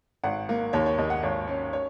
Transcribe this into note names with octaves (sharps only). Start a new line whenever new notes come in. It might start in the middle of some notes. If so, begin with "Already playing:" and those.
G#1 F#5
A#3
D#2 C#5
C#5
D#2 D#5
F#5
G#1 C#5
C#4
C#5